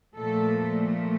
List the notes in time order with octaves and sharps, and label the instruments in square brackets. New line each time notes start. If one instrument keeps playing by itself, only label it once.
[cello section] A#2 F3 A3 A4